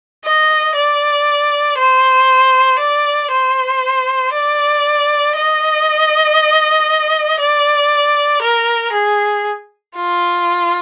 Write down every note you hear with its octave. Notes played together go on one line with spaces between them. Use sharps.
D#5
D5
C5
D5
C5
D5
D#5
D5
A#4
G#4
F4